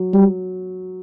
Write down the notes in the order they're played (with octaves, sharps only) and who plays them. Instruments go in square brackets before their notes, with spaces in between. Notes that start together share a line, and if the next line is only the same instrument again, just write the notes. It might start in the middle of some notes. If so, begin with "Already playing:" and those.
Already playing: [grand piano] F#3
[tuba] G3